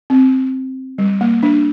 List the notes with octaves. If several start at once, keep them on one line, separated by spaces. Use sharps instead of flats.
C4
G3
A#3
D4